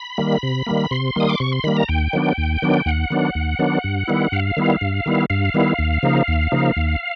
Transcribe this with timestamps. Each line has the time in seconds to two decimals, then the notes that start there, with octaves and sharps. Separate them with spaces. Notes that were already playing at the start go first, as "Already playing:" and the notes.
Already playing: B5
0.18 D#3 G3 A#3
0.43 C3
0.67 D#3 G3 A#3
0.91 C3 C6
1.16 D#3 G3 A#3 D#6
1.29 D6
1.40 C3 C#6
1.52 C6
1.64 D#3 G3 A#3 B5
1.77 A#5
1.88 D#2 G5
2.13 D#3 F#3 B3 D4
2.38 D#2
2.62 D#3 F#3 B3 D4
2.86 D#2 F#5
3.10 D#3 F#3 B3 D4
3.35 D#2
3.59 D#3 F#3 B3 D4
3.84 G2
4.07 D#3 G3 B3 E4
4.32 G2 F5
4.57 D#3 G3 B3 E4
4.81 G2
5.06 D#3 G3 B3 E4
5.30 G2 F5
5.54 D#3 G3 B3 E4
5.79 D#2
6.03 C#3 F3 A#3 D#4
6.28 D#2
6.52 C#3 F3 A#3 D#4
6.76 D#2